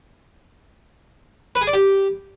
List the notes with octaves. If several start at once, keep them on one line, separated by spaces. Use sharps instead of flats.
B4
G#4
D5
G4